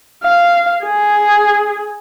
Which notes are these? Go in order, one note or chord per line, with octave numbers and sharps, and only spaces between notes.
F5
G#4